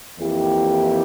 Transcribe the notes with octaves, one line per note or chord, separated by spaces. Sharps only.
F2 E3 A#3 E4 G4